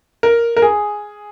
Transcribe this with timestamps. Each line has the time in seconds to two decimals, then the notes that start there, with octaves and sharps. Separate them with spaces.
0.23 A#4
0.57 A#4
0.62 G#4